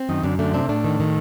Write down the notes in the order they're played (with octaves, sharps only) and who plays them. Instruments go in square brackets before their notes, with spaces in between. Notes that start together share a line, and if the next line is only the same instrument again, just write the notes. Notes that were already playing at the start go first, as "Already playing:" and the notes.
Already playing: [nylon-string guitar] C4
[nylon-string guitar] F#2 [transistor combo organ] D#3
[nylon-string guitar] F#2 [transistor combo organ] D3
[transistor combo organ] D3 [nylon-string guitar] A3
[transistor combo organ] C3 [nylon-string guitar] D4
[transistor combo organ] A2 [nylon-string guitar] D4
[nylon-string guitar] D#3
D#3